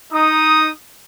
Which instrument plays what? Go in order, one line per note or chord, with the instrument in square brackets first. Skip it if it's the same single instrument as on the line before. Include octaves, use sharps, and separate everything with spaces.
[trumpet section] D#4 D#6